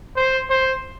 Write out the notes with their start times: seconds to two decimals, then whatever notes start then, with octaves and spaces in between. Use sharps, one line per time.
0.16 C5
0.50 C5